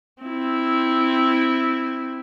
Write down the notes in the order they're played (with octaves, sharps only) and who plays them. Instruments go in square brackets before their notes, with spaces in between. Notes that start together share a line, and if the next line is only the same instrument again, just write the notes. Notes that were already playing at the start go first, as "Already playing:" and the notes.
[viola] C4 E4